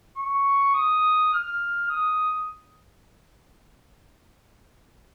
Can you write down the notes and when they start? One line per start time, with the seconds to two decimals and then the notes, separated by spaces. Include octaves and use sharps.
0.18 C#6
0.74 D#6
1.33 F6
1.89 D#6